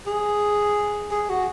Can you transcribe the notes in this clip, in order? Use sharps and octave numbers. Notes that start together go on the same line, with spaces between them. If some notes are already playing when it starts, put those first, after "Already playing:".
G#4
G#4
F#4